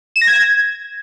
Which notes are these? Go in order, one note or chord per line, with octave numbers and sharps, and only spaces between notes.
E7
A#6
G#6